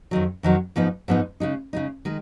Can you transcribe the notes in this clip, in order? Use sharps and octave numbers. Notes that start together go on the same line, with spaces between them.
F2 D#3 F#3
F2 D#3 F#3
G#2 F3 B3 D#4
G#2 F3 B3 D#4
C#3 G#3 D#4
C#3 G#3 D#4
D#3 G#3